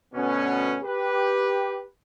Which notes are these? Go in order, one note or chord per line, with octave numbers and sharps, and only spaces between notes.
D2 B2 B3 C#4
G4 B4